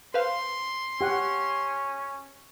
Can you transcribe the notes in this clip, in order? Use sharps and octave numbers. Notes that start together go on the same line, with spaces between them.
B4 C5 F5 C6
C#4 G4 F#5